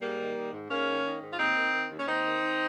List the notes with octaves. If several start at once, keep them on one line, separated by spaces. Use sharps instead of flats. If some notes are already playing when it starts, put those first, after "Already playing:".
G#2 G3 A#3
D#3
D#3
G#2
G#2 A#3 C#4
D#3
D#3
G#2
F4
D#2 C4 D#4
D#3
D#3
D#2
C#4
D#2 C4 D#4
D#3
D#3